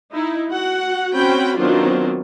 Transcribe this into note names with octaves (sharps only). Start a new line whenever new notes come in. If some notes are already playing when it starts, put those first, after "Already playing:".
D#4 E4
F#4 F#5
C4 C#4 F#4 G5 B5
D#3 F#3 B3 C4 D4 F4